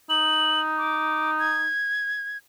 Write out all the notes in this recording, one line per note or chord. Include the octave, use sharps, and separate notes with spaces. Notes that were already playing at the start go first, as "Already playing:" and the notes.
D#4 F#7
D6
G#6